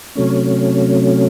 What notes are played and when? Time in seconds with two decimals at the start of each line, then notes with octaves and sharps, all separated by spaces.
0.15 C3 F#3 A3 C#4